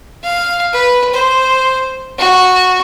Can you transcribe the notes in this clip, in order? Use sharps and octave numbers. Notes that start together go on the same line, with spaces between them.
F5
B4
C5
F#4